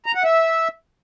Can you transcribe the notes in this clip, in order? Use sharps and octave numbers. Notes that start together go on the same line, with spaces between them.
A#5
F#5
E5